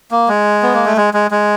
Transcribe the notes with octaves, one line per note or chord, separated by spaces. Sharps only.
A#3
G#3
B3
A#3
A3
G#3
G#3
G#3